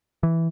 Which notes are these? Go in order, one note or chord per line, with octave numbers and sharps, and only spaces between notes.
E3